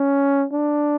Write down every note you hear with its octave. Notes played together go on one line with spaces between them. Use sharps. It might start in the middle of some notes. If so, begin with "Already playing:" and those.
Already playing: C#4
D4